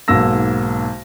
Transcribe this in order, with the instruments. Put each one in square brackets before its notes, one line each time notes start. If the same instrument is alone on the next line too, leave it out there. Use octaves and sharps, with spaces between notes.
[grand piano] B1 G#2 A#3 E6 A#6